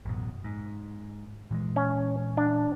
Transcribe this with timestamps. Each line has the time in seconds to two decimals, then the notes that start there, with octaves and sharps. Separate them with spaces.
0.05 A1 F#2 B2
0.44 G#2
1.51 A#2 E3 G#3
1.76 C#4
2.37 D4